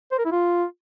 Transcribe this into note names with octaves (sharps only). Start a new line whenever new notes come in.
C5
A#4
E4
F4